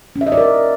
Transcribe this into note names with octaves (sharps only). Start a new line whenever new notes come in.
C#4
E5
D#5
D5
A#4